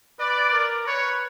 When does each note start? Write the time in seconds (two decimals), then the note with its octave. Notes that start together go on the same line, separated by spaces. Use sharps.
0.19 B4 D5
0.53 A#4
0.86 B4 C#5